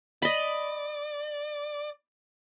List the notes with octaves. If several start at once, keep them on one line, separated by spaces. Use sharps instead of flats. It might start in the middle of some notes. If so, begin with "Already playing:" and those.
D5 D#5 B5